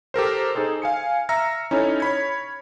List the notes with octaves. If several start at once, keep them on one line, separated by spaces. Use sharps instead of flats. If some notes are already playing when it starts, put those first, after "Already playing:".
G4 A4 A#4 C5
D#4 G#4 A4 C5
F5 G#5 C#7
E5 A#5 E6 F6 A#6 C#7
C#4 D#4 E4 A4 C#5
C#5 B5 G#6